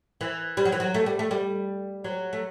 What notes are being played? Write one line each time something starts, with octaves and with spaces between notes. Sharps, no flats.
E3
G3
F#3
E3
F#3
A3
G3
A3
G3
F#3
A3